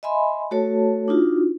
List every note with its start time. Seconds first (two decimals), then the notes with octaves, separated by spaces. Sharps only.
0.03 D#5 E5 G#5 B5 C6
0.51 A3 F#4 A4 C#5 A5
1.08 D4 D#4 F4 F#4